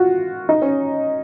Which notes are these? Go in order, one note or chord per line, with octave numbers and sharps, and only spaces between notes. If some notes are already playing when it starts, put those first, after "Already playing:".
Already playing: F4 F#4
D#4
C#4